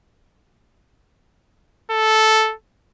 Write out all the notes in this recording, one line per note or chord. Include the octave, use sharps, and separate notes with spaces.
A4